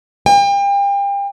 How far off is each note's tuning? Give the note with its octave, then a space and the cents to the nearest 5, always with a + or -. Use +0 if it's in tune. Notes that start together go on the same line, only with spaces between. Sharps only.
G5 +35